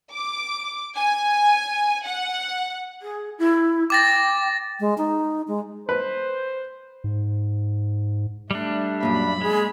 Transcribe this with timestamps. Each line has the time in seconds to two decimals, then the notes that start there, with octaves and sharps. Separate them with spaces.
0.12 D6
0.97 G#5
2.06 F#5
3.02 G#4
3.38 E4
3.90 G5 D6 A6 A#6
4.80 G#3
4.98 D#4
5.48 G#3
5.89 B4 C5
7.04 G#2
8.51 G3 A3 D4 E5
9.03 F#2 A#2 B5
9.41 G#3 G#4